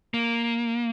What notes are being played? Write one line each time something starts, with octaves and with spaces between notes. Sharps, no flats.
A#3